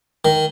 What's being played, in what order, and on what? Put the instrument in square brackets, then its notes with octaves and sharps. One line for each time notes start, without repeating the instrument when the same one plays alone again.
[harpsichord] D#3